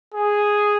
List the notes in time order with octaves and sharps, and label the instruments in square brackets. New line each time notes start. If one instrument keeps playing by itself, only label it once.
[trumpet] G#4